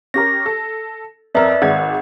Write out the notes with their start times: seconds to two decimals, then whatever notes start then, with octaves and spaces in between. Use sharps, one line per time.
0.14 C#4 G4 A#4 A#6
0.46 A4
1.35 F2 A#4 B4 D5 E5 E6
1.62 G#1 G#3 F#5 G#6